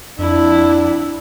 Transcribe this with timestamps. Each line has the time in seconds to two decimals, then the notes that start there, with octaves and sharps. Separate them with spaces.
0.19 F2 D4 E4